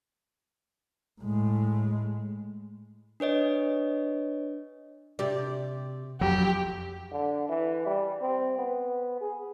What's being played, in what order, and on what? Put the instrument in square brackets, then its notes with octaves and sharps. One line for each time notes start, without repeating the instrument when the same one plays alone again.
[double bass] A2 G#3
[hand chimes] D4 B4 C#5 D#5
[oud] C3 G4 D5
[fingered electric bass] F2 F#3 [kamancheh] G4
[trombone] D3
E3
G3
C4
B3
G#4